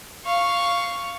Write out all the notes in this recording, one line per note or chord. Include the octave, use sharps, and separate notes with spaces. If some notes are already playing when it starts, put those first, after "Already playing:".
F5 C#6